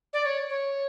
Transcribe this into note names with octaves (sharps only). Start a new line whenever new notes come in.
D5
C#5
C#5